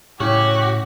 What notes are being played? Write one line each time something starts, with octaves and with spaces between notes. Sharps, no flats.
A2 C#3 E4 F#4 G4